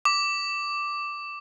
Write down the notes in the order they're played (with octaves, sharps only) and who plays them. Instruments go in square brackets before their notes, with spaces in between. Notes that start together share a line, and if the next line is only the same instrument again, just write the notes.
[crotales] D6